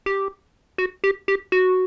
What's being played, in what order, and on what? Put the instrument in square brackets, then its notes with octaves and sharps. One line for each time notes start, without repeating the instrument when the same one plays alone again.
[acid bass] G4
F#4
G4
G4
F#4